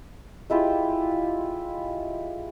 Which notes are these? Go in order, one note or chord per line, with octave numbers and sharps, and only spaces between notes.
G#3 E4 F4 G4